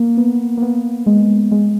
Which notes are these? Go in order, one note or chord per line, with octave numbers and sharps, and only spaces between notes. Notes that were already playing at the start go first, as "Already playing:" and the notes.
Already playing: A#3
B3
A#3
B3
G#3
G#3